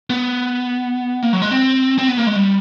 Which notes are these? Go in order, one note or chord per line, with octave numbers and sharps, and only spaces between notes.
B3
A#3
F#3
G#3
C4
C4
B3
A#3
G#3
G3